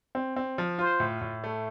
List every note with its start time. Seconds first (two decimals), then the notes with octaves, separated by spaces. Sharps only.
0.15 C4
0.36 C4
0.58 F3
0.78 F4 C5
1.00 A2
1.21 A2
1.44 A3